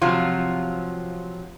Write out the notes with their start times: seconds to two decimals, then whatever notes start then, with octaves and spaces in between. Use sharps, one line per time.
0.01 C3 F3 F#3 C4 F4